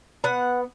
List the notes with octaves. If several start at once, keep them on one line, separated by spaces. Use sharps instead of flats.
B3 F#5